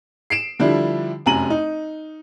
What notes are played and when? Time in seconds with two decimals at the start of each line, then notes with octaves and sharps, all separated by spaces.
0.30 C7 D7 E7
0.59 D3 F3 G3 D4 E4
1.26 F1 F#2 G#5 A#5 D#7 F#7
1.50 D#4